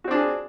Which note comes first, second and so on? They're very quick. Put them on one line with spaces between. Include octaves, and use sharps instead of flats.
F#4 C4 D4 G#4